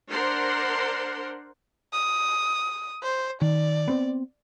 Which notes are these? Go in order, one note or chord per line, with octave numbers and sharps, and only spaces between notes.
D4 A#4 C5 F#5 C6
D#6
C5
D#3 D5
B3 C4